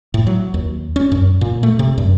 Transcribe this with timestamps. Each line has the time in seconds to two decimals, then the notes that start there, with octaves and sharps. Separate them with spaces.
0.14 A2
0.27 F#3
0.54 D#2
0.96 C#4
1.12 F#2
1.41 A#2
1.63 A3
1.79 C3
1.98 F#2